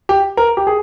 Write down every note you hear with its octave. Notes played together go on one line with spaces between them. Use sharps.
G4
A#4
G4
G#4